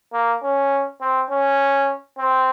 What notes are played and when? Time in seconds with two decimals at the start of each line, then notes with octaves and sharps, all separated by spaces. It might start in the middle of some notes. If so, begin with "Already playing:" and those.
0.13 A#3
0.43 C#4
1.01 C4
1.30 C#4
2.18 C4